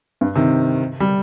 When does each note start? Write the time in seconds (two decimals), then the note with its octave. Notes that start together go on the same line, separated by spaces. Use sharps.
0.21 G2
0.36 C3 D#3
1.00 G3